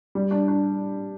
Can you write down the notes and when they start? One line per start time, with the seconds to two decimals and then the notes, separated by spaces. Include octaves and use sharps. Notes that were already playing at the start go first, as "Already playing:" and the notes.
0.15 G3
0.31 D4
0.48 D4